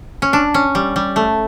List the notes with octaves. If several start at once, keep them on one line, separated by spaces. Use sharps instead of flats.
C#4
D4
C#4
G3
G3
A3